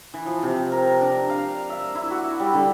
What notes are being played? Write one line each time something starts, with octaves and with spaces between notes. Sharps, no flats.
E3
F3
C3
A#4
D4
F5
E5
E4
F#4
G3
D3